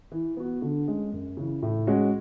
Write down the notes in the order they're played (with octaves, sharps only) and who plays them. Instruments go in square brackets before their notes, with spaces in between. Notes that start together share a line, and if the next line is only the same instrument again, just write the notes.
[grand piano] E3
B3 F#4
D3
G#3 C#4
F#2
C#3 E3
A2
G#3 C#4 F#4